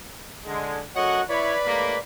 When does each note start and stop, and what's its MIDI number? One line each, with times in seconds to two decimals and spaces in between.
0.46 0.80 50
0.46 0.80 56
0.96 1.21 42
0.96 1.21 66
0.96 1.21 69
0.96 1.21 73
0.96 1.21 75
0.96 1.21 78
1.29 1.55 64
1.29 1.98 71
1.29 1.55 73
1.29 1.98 74
1.29 1.98 83
1.66 1.96 45
1.66 1.96 56
1.66 1.96 58